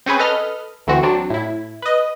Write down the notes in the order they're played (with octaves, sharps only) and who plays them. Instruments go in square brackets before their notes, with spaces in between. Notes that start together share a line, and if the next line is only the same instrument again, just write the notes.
[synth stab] C4 C#4 G#4 B4
A4 B4 D#5 F6
D2 E3 C4 F#4
F#3 C4 D4
A2 E4
B4 D#5